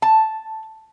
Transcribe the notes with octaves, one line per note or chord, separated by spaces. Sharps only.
A5